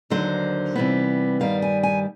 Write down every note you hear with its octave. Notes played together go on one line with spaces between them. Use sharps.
D#2 D3 F#3 C5
C3 E3 G3 B3
G2 D#3 G3 B3 F5
G#5
G#5